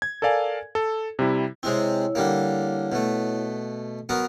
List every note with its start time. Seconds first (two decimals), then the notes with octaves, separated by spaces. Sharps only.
0.02 G#6
0.22 A4 A#4 D5 F5 G#5
0.75 A4
1.19 C3 G3 E4
1.63 C3 G#3 C4 E4 C#5
2.15 D3 G3 A#3
2.92 B2 A3
4.09 F#3 B3 A#4